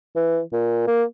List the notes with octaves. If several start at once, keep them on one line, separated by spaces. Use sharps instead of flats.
E3
A#2
A#3